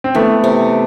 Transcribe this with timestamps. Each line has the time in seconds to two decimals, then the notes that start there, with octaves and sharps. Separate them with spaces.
0.04 C4
0.15 E3 A3 B3
0.44 C3